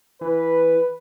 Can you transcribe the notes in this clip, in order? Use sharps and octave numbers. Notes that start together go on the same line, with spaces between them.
E3 B4